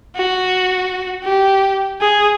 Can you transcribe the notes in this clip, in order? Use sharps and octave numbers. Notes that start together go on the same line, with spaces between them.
F#4
G4
G#4